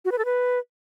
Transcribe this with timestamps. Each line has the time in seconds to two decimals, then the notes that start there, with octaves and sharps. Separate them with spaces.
0.05 F#4
0.12 B4
0.18 A4
0.25 B4